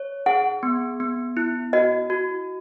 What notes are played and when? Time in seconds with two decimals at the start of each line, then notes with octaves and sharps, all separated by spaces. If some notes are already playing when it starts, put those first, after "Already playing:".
Already playing: C#5
0.26 G#4 F#5
0.63 B3
1.00 B3
1.37 E4
1.73 F#4 D#5
2.10 F#4